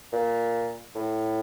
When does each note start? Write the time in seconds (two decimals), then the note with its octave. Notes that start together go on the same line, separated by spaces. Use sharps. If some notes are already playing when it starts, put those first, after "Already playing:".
0.13 A#2
0.95 A2